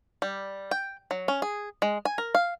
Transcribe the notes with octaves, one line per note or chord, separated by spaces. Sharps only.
G3
G5
F#3
C#4
G#4
G#3
G#5
A#4
F5